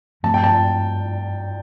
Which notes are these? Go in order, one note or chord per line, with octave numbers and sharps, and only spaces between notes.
G2 F3 A3 C4 A5
G5
A5